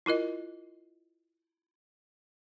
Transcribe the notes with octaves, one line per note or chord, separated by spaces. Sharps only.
E4 F4 A#4 D#5